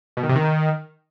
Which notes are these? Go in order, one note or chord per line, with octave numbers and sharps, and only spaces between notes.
B2
D#3
C3
D#3